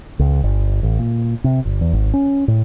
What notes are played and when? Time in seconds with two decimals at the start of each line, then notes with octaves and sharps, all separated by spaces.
0.19 C#2
0.44 G1
0.83 A1
0.99 A#2
1.44 C3
1.66 G1
1.81 E2
1.93 G#1
2.14 C#4
2.48 A2